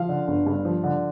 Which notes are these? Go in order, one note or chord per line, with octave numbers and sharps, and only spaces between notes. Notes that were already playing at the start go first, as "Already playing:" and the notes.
Already playing: F3 F5
D3
G1
G2
F3
D3